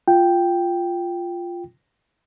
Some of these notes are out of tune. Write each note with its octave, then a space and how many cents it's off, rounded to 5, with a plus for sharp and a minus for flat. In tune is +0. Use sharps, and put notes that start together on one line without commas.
F4 +0 G5 +0